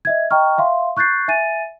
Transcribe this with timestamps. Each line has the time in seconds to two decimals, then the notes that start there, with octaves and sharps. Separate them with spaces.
0.05 D#5 E5 G#6
0.31 D#5 G5 A#5 C#6 F6
0.58 E5 F5 C6
0.97 C#6 F#6 G6 A6 C7
1.28 E5 G#5 A6 D#7